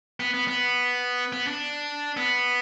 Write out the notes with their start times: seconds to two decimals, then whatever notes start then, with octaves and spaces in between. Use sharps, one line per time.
0.20 B3
0.34 B3
0.48 B3
1.33 B3
1.47 D4
2.17 B3